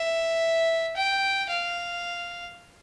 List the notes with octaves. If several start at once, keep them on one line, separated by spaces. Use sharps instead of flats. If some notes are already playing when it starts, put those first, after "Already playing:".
Already playing: E5
G5
F5